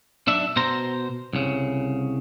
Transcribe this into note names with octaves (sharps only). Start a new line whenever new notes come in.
B1 D4 E5
B2 C5 A#5
C2 C#3